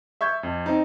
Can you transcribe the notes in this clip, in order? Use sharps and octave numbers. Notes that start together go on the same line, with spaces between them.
E5 C#6 G6 G#6
F2
C4 D#4